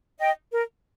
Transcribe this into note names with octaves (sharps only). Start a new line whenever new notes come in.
D#5 G5
A#4